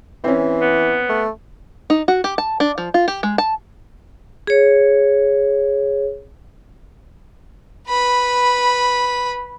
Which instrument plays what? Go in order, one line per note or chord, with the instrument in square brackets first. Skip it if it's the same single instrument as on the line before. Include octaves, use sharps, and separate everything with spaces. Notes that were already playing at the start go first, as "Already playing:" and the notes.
[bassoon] E3 [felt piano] C4 C#4
[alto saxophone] B3
[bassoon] A3
[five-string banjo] D#4
F#4
G4
A5
D4
F3
F4
G4
G#3
A5
[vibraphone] G#4 C#5
[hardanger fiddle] B4 B5